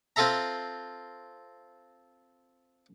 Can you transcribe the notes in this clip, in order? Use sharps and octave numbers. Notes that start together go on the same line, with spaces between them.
C4 F4 A4 E5 A#5